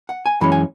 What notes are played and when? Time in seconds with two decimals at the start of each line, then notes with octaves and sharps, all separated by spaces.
0.09 F#5
0.26 G#5
0.41 F#2 E3 G#3 C#4 B5
0.52 G#5